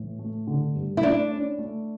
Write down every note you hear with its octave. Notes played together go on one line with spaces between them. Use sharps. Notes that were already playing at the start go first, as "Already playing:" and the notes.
Already playing: A2 E3
A3
D3
G2
E4
A3 D4
C#4
A3